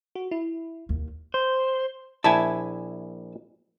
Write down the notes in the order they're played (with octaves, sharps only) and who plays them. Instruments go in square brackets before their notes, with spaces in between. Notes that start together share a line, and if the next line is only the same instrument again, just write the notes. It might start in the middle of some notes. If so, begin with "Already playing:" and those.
[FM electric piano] F#4
E4
[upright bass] D#2
[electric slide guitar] C5
[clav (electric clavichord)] A#1 E4 G#5 [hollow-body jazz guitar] E5 A5